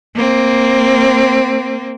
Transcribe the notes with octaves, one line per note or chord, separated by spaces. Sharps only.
A#3 C4